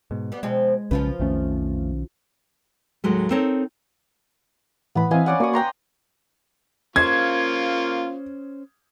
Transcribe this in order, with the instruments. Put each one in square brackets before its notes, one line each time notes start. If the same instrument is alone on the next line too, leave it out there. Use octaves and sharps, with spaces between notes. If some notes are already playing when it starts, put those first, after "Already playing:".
[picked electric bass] G#2 B2
[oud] G3 B3
[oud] B2 F3 C4 [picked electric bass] G#3
[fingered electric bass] B1 C#3 C#4 [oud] F3 F4 B4
[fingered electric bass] B1 D#3 C#4 [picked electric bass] F2 A3
[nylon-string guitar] D#2 A2 F#3 G#3 A3
C4 D#4 A4 A#4 C#5 G5
[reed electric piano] A2 E3 [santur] B3 B5
[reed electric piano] E3 C4 [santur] D#5 F5 G#5
[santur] C#4 D5 F#5
[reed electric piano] A#3 F#4 C#6 [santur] D5 D#6
[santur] G5 A#5 C6
[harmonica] A#3 F4 C#6 [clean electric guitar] C#4 C5 [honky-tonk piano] G#6